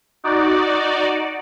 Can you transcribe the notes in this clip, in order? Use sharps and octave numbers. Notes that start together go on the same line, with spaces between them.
D#4 F#4 D5